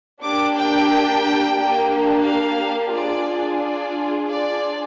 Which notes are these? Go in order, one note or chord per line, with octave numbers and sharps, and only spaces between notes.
A#3 D4 G4 D6
G5
A#3 D4 G4
F5
D4 F4 G#4 D5
D5
D4 F4 G#4 D5